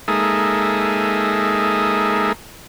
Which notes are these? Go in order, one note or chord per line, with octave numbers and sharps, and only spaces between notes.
G#3 A#3 D#4 G#4 A4 E5